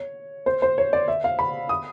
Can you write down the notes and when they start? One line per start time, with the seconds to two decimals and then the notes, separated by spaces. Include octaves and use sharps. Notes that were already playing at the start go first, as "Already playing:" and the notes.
Already playing: C#5
0.46 C5
0.62 C5
0.78 C#5
0.93 D5
1.08 E5
1.24 F5
1.39 B5
1.69 D#6